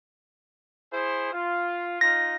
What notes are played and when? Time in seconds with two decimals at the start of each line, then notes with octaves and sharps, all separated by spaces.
0.91 E4 G#4 C5
1.31 F4
2.01 D#4 F4 A#6